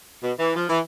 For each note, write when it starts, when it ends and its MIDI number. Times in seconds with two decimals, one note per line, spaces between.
0.23 0.33 47
0.39 0.53 52
0.56 0.66 53
0.69 0.80 52